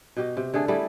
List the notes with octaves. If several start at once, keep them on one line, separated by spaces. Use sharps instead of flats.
B2 G4 D#5
C3
D3 A3 G#4 A4
G3 A3 E4 G#4